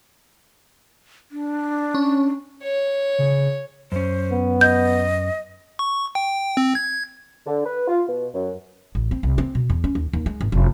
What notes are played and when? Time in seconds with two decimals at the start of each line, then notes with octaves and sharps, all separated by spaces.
1.31 D4
1.94 C#4
2.63 C#5
3.19 C#3
3.92 F#2 C#4 C5
4.31 B3
4.61 D#5 G6
5.79 C#6
6.15 G5
6.57 C4
6.75 G#6
7.45 D3
7.65 B4
7.88 F4
8.09 B2
8.33 F#2
8.95 A1
9.11 C4
9.23 C2
9.38 C4
9.55 B2
9.70 E2
9.84 C#4
9.95 D#2
10.13 D#2
10.26 G#3
10.41 G#1
10.52 F1